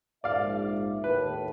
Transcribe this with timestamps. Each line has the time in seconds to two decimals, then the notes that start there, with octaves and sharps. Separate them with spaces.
0.24 A#1 G#2 D5 E5 F5
1.04 D#2 A2 B4